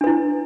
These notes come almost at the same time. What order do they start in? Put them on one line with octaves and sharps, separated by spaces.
D4 B4 E4